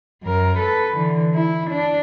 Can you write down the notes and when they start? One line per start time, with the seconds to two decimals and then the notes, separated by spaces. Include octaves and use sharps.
0.23 F#2 A#4
0.58 A4 B4
0.96 D3 E3
1.35 E4
1.71 D4